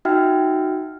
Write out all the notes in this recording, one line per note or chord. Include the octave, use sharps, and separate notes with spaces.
D#4 F#4 E5 G5 F6